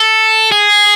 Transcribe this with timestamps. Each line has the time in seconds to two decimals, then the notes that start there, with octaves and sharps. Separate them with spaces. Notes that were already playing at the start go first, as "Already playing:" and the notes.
Already playing: A4
0.52 G#4